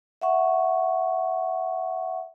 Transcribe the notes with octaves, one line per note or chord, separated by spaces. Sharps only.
E5 F#5 C#6